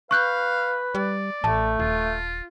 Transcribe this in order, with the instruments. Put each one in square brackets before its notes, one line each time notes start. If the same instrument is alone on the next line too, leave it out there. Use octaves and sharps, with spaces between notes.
[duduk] B4 [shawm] F5 [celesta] C#6 F#6 G6
[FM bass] G3 [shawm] D5
[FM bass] A1 [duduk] A3 [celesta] A5
[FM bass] D#1 [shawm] F4